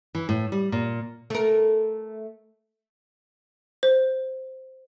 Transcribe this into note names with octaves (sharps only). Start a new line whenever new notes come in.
E3
A2
G3
A#2
A3 A#4
C5